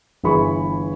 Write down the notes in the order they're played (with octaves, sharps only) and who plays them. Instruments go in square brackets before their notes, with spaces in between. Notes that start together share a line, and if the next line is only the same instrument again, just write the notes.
[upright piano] G1 E3 G#4 B5 C#6